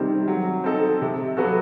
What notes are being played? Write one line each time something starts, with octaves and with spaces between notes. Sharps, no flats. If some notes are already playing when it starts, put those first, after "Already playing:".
Already playing: C3 D#3 G3 C4
F#3
C4 D#4 A4
C3
F#3 B3 F#4 A4